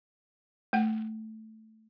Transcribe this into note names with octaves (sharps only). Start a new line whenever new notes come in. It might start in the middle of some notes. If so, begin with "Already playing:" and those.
A3 F#5